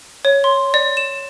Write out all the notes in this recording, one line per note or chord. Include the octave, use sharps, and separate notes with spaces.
C#5
C6
D5
E7